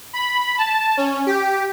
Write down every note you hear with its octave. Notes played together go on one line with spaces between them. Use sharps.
B5
A5
C#4
G4